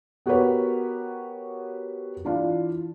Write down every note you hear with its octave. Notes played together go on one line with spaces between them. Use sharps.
B3 F#4 G4 A#4 B4 C#5
E3 D4 F4